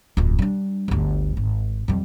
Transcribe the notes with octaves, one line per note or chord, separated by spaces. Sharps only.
D1 F2
G3 D4
G1 D2
G#1
F2 G3